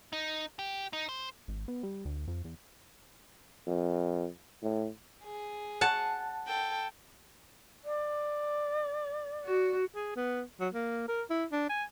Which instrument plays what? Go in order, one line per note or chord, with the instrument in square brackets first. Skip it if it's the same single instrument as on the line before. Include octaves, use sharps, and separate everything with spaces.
[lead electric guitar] D#4
G4
D#4
C5
[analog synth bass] G#1
B3
G3
D2
F2
E2
[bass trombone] F2
A2
[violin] G#4
[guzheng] F#5 A5
[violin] A4 G5
[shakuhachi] D5
[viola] F#4
[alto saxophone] G#4
B3
F#3
A#3
A#4
E4
D4
G#5